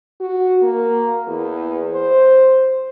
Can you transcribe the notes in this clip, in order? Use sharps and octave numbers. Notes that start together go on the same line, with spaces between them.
F#4
A#3
E2
C5